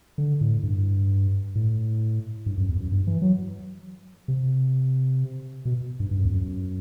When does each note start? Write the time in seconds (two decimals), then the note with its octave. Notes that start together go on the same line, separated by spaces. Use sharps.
0.18 D3
0.41 A2
0.63 G2
1.55 A2
2.46 G2
2.57 F#2
2.69 E2
2.80 F#2
2.92 G2
3.07 E3
3.22 F#3
4.28 C3
5.65 B2
6.00 G2
6.11 G2
6.18 F#2
6.25 E2
6.32 F#2